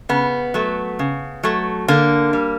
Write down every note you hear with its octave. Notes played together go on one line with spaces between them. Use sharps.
C#3 B3
F#3 A3
C#3
F#3 A3
D3 A#3
G3